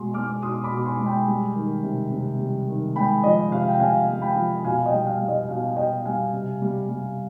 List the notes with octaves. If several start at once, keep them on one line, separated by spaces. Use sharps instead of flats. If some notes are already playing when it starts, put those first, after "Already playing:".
Already playing: B2 G#3 C6
G#3 D6 F6
B2 C6 D#6
B5 D6
B2
G#5 C6
G#3
G5 B5
G3
D#3
C3
C3
G3
D#3
G#3 G5 B5
F3 D#5
C3 F5
G5
C3 F5 G#5
G#3
G5 B5
F3
B2 F5 G#5
D#5 G5
G3
G5
F5
G3
D#5
B2 F5
B2 D#5 G5
G3 F5 G#5
C3
G3
G3